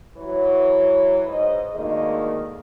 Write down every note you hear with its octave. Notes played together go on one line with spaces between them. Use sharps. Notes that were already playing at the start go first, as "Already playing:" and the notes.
E3 F#3 C#5
G#2 D#5
D2 D#3 G#3 A#3 D#5